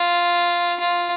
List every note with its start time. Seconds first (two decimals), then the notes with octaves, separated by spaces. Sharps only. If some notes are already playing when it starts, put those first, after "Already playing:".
Already playing: F4
0.80 F4